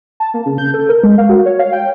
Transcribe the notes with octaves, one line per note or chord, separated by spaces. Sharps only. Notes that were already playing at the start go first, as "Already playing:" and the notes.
A5
A#3
C#3
G6
A4
A#4
G#3
F5
F#4
C#5
F5
G5